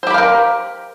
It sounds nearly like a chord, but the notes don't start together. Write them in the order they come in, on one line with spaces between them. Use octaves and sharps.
C5 G4 B5 F5 A#4